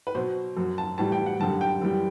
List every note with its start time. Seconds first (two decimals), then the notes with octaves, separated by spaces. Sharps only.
0.07 B4
0.15 B2 F#3 C5
0.57 F#2 F#3
0.78 A5
0.98 A2 E3 G3 A5
1.12 G5
1.26 F#5
1.40 F#2 D3 G3 A5
1.61 G5
1.81 F#2 E3 G3